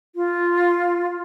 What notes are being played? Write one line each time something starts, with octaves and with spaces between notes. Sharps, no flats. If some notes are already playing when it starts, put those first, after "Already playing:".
F4